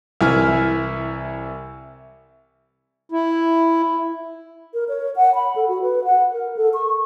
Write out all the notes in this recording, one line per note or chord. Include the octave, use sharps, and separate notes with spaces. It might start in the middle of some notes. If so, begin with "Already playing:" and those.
C2 E3 E4 E5 G#5 F6
E4
A#4
C#5
F#5
B5
A4
F#4
B4
F#5
A#4
A4
C#6